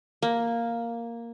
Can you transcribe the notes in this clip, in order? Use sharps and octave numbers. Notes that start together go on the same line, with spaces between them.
A#3